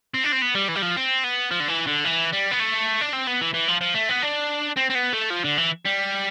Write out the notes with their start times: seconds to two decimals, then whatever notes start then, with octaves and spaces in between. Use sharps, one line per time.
0.14 C4
0.24 D4
0.32 C4
0.42 B3
0.55 G3
0.68 E3
0.75 G3
0.82 F3
0.96 C4
1.24 B3
1.51 F3
1.60 D3
1.68 E3
1.86 D3
2.04 E3
2.32 G3
2.51 B3
2.60 A3
3.01 D4
3.13 C4
3.27 B3
3.41 E3
3.54 E3
3.68 F3
3.81 F3
3.94 A3
4.09 B3
4.22 D4
4.76 C4
4.90 C4
4.95 B3
5.13 A3
5.30 F3
5.44 D3
5.58 E3
5.86 G3